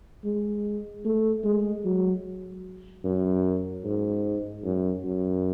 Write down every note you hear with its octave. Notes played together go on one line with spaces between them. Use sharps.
G#3
A3
G#3
F#3
F#2
G#2
F#2
F#2